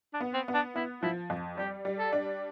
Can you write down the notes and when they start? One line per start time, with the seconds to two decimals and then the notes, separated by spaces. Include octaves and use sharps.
0.14 D4
0.21 B3
0.34 C4
0.48 B3
0.54 D4
0.75 B3 E4
1.03 F3 E4
1.30 F2
1.57 G3 G4
1.85 G3
1.99 A4
2.13 D4